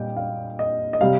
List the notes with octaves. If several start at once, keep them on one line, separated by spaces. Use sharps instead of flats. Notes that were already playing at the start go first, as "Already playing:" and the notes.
Already playing: A#2 G3 D#5 G5
F5
D#5
D#5
C3 G3 F5